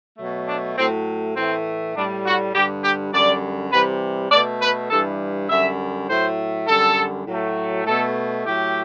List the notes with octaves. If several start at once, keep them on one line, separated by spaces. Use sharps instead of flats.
B2 F#3 A3
D4
A2 F#3 A3 C4
A2 E3 A3 C4
A2 G3 D4
F#4
G2 D3 G3 G4
G4
F#2 D3 G3 D5
C3 E3 G3 B4
B2 A3 D5
B4
G2 E3 G3 A4
F#2 D3 G3 E5
A2 F#3 A3 C5
F#2 D3 G3 A4
A2 F#3 A3
B2 A3 A4
A2 F#3 A3 G4